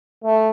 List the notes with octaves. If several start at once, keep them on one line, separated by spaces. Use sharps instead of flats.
A3